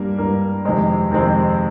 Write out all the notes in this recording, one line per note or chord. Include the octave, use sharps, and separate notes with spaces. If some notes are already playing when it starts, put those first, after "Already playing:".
Already playing: G2 G3 A#3 A#4
G2 G3 A#3
F2 C3 D#3 G#3 C4
F2 C3 D#3 G#3 C4